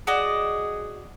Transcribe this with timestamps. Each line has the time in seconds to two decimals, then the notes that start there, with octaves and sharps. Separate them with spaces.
0.07 F#4 G#4 D5 D#5